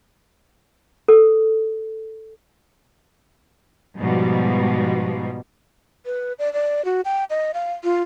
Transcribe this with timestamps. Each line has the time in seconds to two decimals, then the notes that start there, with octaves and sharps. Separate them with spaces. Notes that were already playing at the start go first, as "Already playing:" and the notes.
1.08 A4
3.97 G#2 B2 F3 G3
6.06 B4
6.39 D5
6.53 D5
6.85 F#4
7.05 G5
7.30 D#5
7.54 F5
7.84 F4